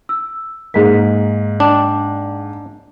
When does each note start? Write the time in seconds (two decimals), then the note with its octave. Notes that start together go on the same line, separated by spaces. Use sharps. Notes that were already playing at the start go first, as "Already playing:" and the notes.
0.09 E6
0.74 G#2 A#3 G#4 B6
1.60 D4 D5 G5